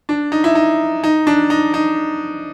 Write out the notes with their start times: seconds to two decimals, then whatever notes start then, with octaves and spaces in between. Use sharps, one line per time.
0.09 D4
0.32 D#4
0.44 E4
0.55 D#4
1.04 D#4
1.27 D4
1.50 D#4
1.74 D#4